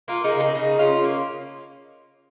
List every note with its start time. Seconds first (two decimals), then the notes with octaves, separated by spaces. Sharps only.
0.08 A#3 F4 A#4
0.24 D#4 G#4
0.32 C#3
0.40 D#4 G#4
0.55 C#3 D#4 G#4
0.79 C#3 C#4 F4
1.04 A#3